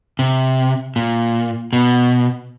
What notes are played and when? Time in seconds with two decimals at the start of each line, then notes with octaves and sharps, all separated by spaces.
0.19 C3
0.96 A#2
1.73 B2